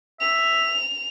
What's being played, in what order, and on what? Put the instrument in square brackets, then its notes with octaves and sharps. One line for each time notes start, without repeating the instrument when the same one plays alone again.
[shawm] E5 [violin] F7